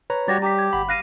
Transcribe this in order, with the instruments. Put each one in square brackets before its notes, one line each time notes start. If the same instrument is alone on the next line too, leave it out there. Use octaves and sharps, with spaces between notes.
[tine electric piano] B4 C#5 A#5
[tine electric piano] G3 [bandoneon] F#4 G4 C#5 [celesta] A6 A#6
[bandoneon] G4 [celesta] A#5 D6 B6
[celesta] G#6
[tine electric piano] G1 B5 [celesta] F#5
[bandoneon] F5 [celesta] F#6 A#6 D#7